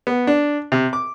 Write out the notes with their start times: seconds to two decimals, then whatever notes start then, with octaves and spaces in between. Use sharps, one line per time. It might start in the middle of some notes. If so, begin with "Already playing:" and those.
0.07 B3
0.27 D4
0.72 C3
0.93 D6